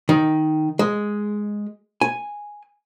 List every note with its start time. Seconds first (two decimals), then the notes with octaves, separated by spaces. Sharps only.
0.09 D#3
0.79 G#3
2.01 G#5